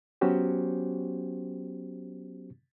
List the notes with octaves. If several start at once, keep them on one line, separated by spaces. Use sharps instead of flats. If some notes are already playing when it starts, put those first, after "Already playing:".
F#3 B3 C#4 F#4 G4 C5